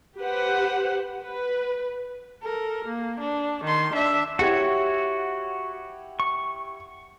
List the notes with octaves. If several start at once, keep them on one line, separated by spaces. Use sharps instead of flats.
G4 B4 C5 F#5
B4
A4 A#4
A#3
D4
D#3 C6
D4 E5
E4 F#4 G4 C#5 F#5
C#6